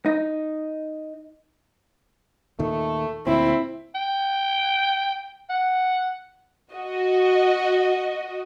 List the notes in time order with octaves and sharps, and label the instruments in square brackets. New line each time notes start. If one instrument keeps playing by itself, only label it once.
[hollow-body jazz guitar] D#4
[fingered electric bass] D#2 A#2 D#3 [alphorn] A3
[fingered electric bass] D2 A#2 [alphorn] C4 [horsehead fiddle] E4
[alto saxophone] G5
F#5
[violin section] F#4 D#5